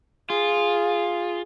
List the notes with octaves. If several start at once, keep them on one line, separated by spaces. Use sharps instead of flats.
F4 G#4